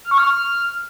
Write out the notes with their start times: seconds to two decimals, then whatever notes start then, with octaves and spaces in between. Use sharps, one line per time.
0.05 F6
0.11 C#6
0.18 F6